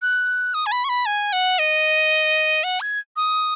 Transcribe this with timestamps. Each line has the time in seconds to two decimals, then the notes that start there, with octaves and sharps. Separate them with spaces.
0.02 F#6
0.54 D#6
0.66 G#5
0.72 B5
0.84 C#6
0.89 B5
1.06 G#5
1.33 F#5
1.59 D#5
2.64 F#5
2.81 G#6
3.16 D#6